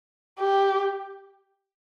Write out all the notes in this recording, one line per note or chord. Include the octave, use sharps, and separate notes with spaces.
G4